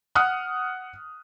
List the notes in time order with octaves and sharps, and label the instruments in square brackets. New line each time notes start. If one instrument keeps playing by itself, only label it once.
[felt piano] F#5 D#6 F6 F#6